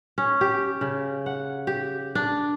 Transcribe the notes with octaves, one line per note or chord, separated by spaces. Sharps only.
C#4
G4
C#3
F#5
G4
D4